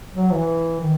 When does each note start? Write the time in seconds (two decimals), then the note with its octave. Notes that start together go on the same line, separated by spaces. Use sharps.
0.15 F#3
0.32 E3
0.80 D#3